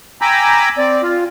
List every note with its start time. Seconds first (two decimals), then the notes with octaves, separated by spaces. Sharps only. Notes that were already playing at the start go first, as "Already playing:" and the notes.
0.21 G5 G#5 A#5 B5 D6 E6
0.78 C4 D5
1.03 F4